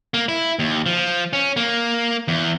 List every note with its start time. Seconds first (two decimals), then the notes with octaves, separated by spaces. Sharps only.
0.14 A#3
0.29 E4
0.59 D#2
0.86 F3
1.33 C#4
1.57 A#3
2.28 E2